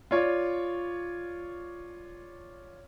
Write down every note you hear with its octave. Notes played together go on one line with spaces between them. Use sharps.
F4 C#5 D5